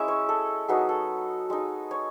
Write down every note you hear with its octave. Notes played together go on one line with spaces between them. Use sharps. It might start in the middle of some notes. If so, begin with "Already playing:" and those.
Already playing: G#3 C#4 E4 E5
C#5
A4
F#3 B3 D#4 G#4
A4
G#3 D#4
C#5